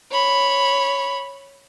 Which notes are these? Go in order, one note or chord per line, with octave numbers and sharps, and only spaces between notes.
C#5 B5